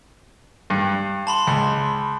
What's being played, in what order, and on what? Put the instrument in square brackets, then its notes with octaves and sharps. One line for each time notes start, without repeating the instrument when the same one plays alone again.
[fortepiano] G2
[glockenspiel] A5 B5 C6
[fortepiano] C#2